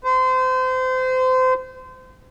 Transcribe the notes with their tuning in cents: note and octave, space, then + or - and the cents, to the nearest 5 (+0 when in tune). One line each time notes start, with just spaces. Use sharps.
C5 -30